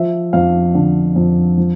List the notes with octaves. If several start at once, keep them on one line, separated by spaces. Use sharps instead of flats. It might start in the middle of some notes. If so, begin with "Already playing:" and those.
Already playing: F3 E5
F2 F5
D3
F2
F3